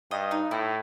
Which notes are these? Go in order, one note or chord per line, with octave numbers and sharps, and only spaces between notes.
G2 D#5
D#4
A2 E4